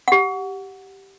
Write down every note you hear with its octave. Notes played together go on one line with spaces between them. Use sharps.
G4 F#5